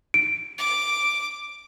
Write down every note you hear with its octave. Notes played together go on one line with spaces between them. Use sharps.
D7
D6